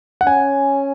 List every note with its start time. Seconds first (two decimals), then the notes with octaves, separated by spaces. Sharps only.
0.21 F#5
0.27 C#4 G#5